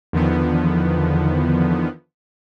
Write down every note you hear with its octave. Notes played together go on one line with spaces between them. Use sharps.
E2 D3 D#3 F3 B3